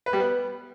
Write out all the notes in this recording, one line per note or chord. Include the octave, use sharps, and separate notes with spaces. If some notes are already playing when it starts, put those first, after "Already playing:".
B4
G3
B3